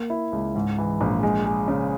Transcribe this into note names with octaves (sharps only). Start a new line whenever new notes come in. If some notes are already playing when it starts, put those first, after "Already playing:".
Already playing: A#3
E4
C#2
G#2
E3
A#1
G#3
G#3
C#3